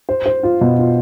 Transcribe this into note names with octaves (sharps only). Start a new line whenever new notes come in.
C5
C5
F4
B2
F4